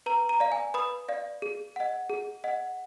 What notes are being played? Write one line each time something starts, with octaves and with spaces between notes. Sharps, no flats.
B4 A#5
A#5
D5 F5
G#5
B4 B5 D#6
D5 F5
G#4
D#5 F#5
G#4
D#5 F#5